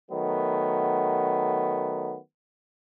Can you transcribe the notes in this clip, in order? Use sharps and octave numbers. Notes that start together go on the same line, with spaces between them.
D#3 F#3 A3 B3